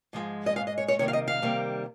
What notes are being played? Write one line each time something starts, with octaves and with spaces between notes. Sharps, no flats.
G#2 F3 G#3
D#5
G#2 F3 G#3 F5
D#5
C#5
C#5
C3 D#3 G3 A#3 C#5
F5
D#5
F5
C3 D#3 G3 A#3